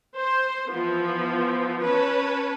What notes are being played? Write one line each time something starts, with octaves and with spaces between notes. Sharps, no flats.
C5
E3 F3 B3
C#4 B4 C#5 A5